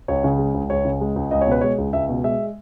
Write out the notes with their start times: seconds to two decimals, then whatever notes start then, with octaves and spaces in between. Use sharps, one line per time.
0.08 C#2 C#5
0.24 C#3
0.38 G#3
0.54 C#2
0.70 C#2 C#5
0.85 C#3
1.01 G#3
1.16 C#2
1.31 C#2 D#5
1.41 C#5
1.47 B2 B4
1.61 G#3 C#5
1.78 C#2
1.93 C#2 E5
2.09 B2
2.24 G#3 E5